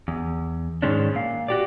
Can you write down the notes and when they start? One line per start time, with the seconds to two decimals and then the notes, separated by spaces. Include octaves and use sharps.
0.08 E2
0.82 G#2 B2 D#3 G#3 C#4 D4
1.14 A#2 F5
1.48 F#4 G4 D5